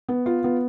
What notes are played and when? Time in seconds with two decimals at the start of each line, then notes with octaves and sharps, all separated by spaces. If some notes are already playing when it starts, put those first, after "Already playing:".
0.08 B3
0.26 F4
0.44 B3